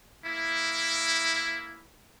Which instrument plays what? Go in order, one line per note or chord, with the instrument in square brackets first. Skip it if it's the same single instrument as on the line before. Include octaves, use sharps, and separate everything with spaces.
[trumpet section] A#3 E4